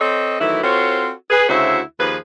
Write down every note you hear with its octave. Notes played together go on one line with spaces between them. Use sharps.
C4 A4 C5 C#5 D#5
D#3 E3 F#3 A3 E4
C4 F4 F#4 A4 C5 C#5
G#4 B4
D2 C#3 E4 F#4 C5 E5
D#2 F3 G#4 B4